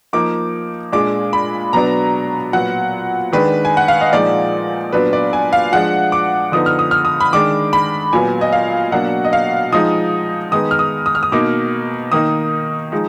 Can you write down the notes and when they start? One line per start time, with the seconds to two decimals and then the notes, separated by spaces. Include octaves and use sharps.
0.13 F3 A#3 D#4 D6
0.93 A#2 G#3 D4 D6
1.33 B5
1.73 B2 F#3 B3 D4 A#5
2.53 A#2 F#3 B3 F#5
3.33 D#3 G#3 D4 B4
3.65 G#5
3.77 F#5
3.88 F5
4.01 D#5
4.13 A#2 F3 G#3 D#4 D5
4.92 A#2 F#3 B3 D4 B4
5.13 D5
5.33 G#5
5.53 F5
5.72 F3 G#3 D4 F#5
6.12 D6
6.52 D3 F3 B3 D#4 D#6
6.66 F6
6.79 D#6
6.91 F6
7.05 D#6
7.20 B5
7.33 D#3 G#3 D4 D6
7.73 B5
8.13 A#2 F#3 B3 G#5
8.41 D#5
8.53 F5
8.92 B2 F#3 A#3 D4 F#5
9.25 D#5
9.33 F5
9.72 F3 G#3 D#4 D#6
10.52 D#3 G#3 B3 D#4 D#6
10.71 F6
10.79 D#6
11.06 D#6
11.15 F6
11.23 D#6
11.32 B2 A#3 D#4 D6
12.12 D#3 A#3 D#4 D#6
12.92 F3 G#3 D#4